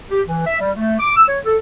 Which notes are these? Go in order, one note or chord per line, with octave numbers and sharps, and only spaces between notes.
G4
E3
E5
G3
A3
D6
E6
C#5
A4